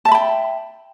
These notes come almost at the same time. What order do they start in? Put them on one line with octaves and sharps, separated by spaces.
A5 E5 B5 G5